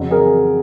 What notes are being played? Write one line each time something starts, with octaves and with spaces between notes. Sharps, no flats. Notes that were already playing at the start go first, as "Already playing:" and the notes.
Already playing: F2 C#3 F#3
G#4 A#4